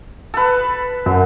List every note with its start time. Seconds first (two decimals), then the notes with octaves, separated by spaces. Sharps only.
0.34 A4 B4
1.06 F#2